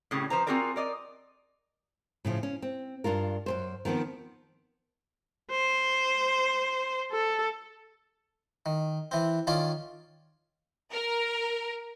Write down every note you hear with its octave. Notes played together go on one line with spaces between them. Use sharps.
A2 C#3 G3
F3 B4 C5 A#5
C4 F4 F#4 G#4 A#4 D5
A#4 D5 D#5
A2 C#3 E3 F3
C#4
C4
G2 D4 F4 A#4
F#2 A#2 C5
D#3 F3 B3 C4
C5
A4
D#3
E3 C4
D#3 C#4 F4 D5
A#4